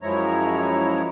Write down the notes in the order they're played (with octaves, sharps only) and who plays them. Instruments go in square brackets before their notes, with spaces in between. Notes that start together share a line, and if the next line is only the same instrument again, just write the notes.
[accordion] F#2 F3 G#3 E4 C#5 A#5